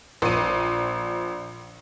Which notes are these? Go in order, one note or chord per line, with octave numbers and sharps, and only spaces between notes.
A#1 D#7